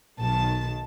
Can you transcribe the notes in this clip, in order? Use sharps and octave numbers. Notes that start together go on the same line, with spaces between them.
B1 D#3 A5